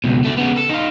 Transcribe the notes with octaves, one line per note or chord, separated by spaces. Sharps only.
C#2 B2
D3 A3
C#3 B3
A4
D#4 F4